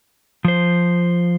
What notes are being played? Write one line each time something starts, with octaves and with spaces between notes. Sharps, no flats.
F3 C5